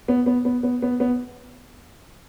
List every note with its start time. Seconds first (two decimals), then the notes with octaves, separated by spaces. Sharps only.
0.08 B3
0.26 B3
0.45 B3
0.63 B3
0.82 B3
1.00 B3